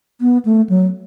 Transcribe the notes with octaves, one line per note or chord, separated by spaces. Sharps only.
B3
A3
F#3